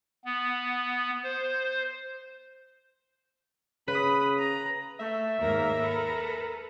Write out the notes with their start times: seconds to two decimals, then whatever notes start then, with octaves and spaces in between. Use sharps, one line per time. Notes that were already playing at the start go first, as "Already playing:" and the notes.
0.25 B3
1.24 C5
3.88 C#3 B4 B5 D#6
4.39 A#5
5.00 A3 E5
5.40 D#2 G#2 A#3 A#4
5.81 A4 B4